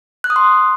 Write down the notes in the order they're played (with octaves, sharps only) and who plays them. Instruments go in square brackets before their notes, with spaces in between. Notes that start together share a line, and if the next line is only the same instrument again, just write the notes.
[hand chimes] F#6
D#6
C6